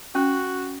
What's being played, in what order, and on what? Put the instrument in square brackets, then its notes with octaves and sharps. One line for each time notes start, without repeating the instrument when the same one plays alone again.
[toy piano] C#4 [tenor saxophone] F#4